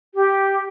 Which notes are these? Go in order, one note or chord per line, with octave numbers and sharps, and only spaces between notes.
G4